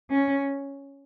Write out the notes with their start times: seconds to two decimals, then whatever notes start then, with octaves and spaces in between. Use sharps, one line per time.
0.11 C#4